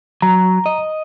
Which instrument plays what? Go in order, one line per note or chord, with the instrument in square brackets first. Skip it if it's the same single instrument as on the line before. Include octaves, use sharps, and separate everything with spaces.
[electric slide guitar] F#3 [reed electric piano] A#5
[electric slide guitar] D#5